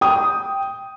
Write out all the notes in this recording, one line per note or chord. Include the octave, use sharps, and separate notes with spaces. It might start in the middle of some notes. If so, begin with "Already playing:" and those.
G5 D#6